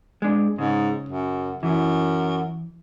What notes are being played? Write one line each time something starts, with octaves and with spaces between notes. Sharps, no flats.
G#3 D4
G#2 C#3
F#2
F#2 E3